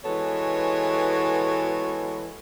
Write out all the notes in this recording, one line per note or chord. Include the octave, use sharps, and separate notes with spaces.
E3 G#3 B3 F#4 A4 C#5